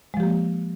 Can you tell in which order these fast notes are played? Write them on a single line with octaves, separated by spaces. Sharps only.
G#3 F3 G4 A#3